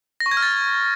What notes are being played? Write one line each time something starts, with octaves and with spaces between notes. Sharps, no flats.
A#6
C#6
G#6
F6
A6